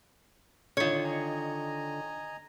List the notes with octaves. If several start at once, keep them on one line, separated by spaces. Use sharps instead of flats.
D3 D#3 F4 C#5
D#5 G#5 A#5